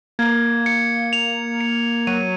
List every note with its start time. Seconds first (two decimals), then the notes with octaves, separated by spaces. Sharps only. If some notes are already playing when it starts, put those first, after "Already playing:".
0.19 A#3 G#6
0.66 C#7
1.13 F7
1.61 C#7
2.07 F#3 D#7